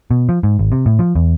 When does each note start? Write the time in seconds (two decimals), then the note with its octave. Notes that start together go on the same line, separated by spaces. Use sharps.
0.11 B2
0.29 F3
0.43 G#2
0.59 G#1
0.72 C3
0.86 A2
0.99 F3
1.15 E2